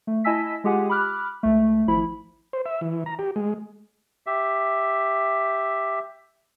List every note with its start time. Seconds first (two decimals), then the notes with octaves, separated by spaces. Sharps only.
0.07 A3
0.24 E4 D#5 G#5 A5 E6 B6
0.64 G#3 F4 G4 G#4 F#5 G#5
0.89 B5 D6 F6 F#6
1.43 C#2 A3
1.88 G#1 F3 E4 B5
2.53 C5
2.66 E5
2.81 E3
3.06 A#5
3.19 G4
3.36 G#3
4.26 G4 E5